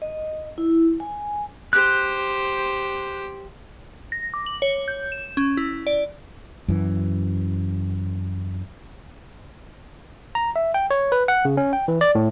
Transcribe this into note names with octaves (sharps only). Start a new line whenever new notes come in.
D#5
E4
G#5
G4 C5 F#6
A#6
D6
F#7
C#5
G6
E7
C#4
E4
D5
F#2 E3
A#5
E5
G5
C#5
B4
F#5
C#3
C#4
G5
E3
D5
A2